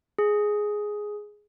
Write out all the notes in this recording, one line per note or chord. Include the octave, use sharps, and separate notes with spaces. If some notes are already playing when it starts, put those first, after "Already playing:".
G#4